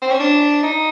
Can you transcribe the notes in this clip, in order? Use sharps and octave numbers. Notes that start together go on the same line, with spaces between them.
C4
C#4
D4
D#4